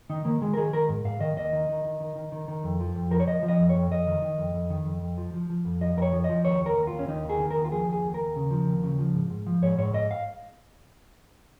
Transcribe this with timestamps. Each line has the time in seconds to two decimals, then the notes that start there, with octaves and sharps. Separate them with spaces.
0.10 D#3 D#4
0.25 D#3 A#3
0.42 D#3 G#3
0.54 A#4
0.57 D#3 G#4
0.73 D#3 A#4
0.89 G#2
1.05 G#2 F5
1.20 D#3 D#5
1.37 D#2 D#5
1.53 D#3
1.69 D#3
1.85 D#3
2.00 D#3
2.16 D#3
2.32 D#3
2.48 D#3
2.64 F2
2.80 F3
2.95 F2
3.11 F3 A#4
3.20 C#5
3.27 F3 D#5
3.43 F3
3.48 D#5
3.59 F2
3.70 C#5
3.76 F2
3.91 F2 D#5
4.07 D#3
4.22 D#3
4.38 F2
4.54 F2
4.70 D#3
4.86 F2
5.02 F2
5.17 F3
5.34 F3
5.50 F3
5.65 F2
5.81 F3 D#5
5.97 F2 A#4
6.02 C#5
6.13 F3
6.24 D#5
6.29 F3
6.45 D#2 C#5
6.61 D#2
6.66 A#4
6.77 D#2
6.87 F4
6.93 D#2
6.99 C#4
7.08 D#2 D#4
7.25 D#3 G#4
7.40 D#3
7.51 A#4
7.56 D#2
7.65 F4
7.72 F3 G#4
7.88 D#2 G#4
8.04 D#2
8.14 A#4
8.20 D#2
8.36 C#3
8.51 F3
8.67 D#2
8.83 C#3
8.99 F3
9.15 G#2
9.30 G#2
9.47 F3
9.62 G#2 C#5
9.78 G#2 C#5
9.94 G#2 D#5
10.11 F5